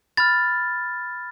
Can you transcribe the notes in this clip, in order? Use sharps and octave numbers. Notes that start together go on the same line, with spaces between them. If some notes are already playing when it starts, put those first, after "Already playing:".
B5 F6 A6